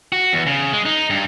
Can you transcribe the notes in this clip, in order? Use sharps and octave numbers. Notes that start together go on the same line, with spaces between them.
F#4
E2
C#3
G#3
D#4
G2